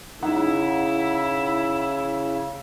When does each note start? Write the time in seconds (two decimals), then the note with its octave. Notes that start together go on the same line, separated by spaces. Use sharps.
0.23 C#3 D#4 E4 F#5